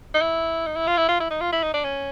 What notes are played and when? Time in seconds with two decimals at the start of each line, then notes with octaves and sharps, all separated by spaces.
0.14 D#4
0.21 E4
0.67 D#4
0.76 E4
0.87 F4
0.97 E4
1.08 F4
1.20 E4
1.30 D#4
1.41 F4
1.52 E4
1.63 D#4
1.74 D4
1.85 C#4